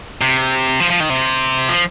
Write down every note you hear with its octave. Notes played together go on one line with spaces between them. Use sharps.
C3
F3
F3
D#3
C3
F3